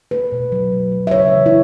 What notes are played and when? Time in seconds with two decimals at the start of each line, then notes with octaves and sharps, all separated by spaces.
0.11 A3 B4
0.32 B2
0.52 F#3 A3
0.72 B2
0.92 A3
1.07 E5
1.11 C#3 C#5
1.31 E3 A3
1.46 E4